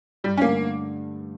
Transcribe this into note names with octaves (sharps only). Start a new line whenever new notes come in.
G2 G3
C#4
D3 A3 A#3